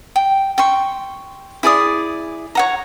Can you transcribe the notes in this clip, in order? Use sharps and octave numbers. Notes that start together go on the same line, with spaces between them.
G5
G5 C6 C#6
E4 G#4 D5 D#6
C#5 F#5 A#5